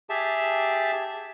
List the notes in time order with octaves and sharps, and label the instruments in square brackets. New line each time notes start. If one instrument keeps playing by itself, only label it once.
[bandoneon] G4 G#4 E5 A5